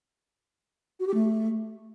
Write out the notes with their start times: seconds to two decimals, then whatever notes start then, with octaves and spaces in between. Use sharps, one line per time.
1.00 F#4
1.07 G4
1.14 A3